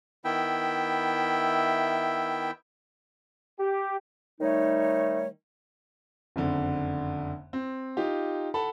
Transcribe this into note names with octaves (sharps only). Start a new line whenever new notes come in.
D#3 B3 E4 E5 G5
G4
D#3 G3 A3 D#4 C#5
F#1 F2 D3
C4
D#4 F4 G4
A4 F#5 A5 B5